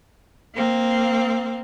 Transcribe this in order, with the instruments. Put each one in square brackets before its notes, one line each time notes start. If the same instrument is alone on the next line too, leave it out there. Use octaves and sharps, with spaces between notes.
[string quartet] A#3 C4